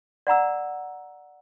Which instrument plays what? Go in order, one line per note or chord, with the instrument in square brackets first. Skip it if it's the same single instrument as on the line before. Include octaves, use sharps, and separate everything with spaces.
[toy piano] D5 F#5 A#5 E6